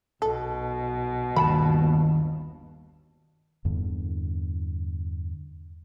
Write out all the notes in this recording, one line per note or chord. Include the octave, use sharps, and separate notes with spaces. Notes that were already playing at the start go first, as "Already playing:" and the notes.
B1 B2 A4
G1 D#2 D#3 F#5 A5 B5
E2 G2 D3